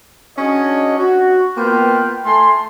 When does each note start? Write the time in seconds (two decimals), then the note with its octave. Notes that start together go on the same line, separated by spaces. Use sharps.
0.37 C#4 D4 F#4 G#4 C#5 D#5
0.99 F#4
1.58 A#3 B3 F4 B4 G5
2.25 A3 A4 G#5 C6